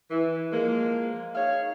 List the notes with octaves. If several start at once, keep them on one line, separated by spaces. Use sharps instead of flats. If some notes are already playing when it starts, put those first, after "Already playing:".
E3
F3 G#3 A#3
D#4 G#4 C#5 F5